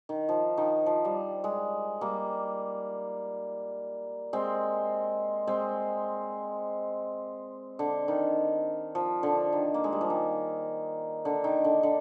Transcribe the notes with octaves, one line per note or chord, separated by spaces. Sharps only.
D#3
F3
D#3
F3
G3
G#3
G3 A#3
G#3 C4
G#3 C4
D3
D#3
F3
D3
D#3
A#3
G#3
G3
F3
D#3
D3
D#3
D3
D3